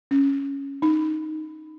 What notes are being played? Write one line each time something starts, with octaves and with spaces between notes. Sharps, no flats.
C#4
D#4